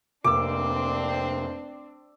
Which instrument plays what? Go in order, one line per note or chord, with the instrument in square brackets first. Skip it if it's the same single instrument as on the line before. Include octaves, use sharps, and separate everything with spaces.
[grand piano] F1 A#3 E6 [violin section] C4 D4 [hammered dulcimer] D6